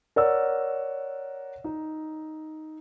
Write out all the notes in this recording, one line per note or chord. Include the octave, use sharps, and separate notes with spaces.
A#4 C#5 D5 F#5 E6
D#4